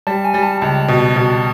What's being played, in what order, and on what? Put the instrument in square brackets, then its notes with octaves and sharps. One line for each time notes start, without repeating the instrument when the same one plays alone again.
[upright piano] G3 [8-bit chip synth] A5
[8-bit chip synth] G#5
[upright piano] G3
[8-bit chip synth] A5
[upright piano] C#2 [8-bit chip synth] A5
[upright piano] B2
B2